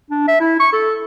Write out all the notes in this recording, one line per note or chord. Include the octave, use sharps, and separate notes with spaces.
D4
E5
E4
C#6
A4